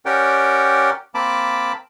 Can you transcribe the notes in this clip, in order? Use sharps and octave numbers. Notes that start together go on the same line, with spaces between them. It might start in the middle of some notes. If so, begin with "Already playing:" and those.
C#4 G4 A#4 D5 F#5 G5
A#3 C4 A5 B5 D6